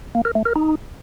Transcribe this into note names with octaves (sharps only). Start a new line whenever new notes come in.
A#3
A#4
A3
A#4
D#4